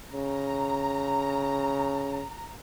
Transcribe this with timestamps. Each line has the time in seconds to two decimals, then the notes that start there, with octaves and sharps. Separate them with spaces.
0.14 C#3 A#5